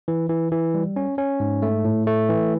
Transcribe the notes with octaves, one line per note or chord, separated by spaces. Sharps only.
E3
E3
E3
G3
C#4
C#4
G#2
A3
A2
A3
E3